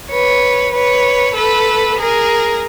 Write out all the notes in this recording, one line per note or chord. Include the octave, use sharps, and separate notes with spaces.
B4 C#5
B4 C#5
A4 B4
G#4 A#4